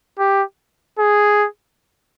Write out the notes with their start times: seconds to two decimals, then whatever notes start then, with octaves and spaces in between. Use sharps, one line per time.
0.19 G4
0.99 G#4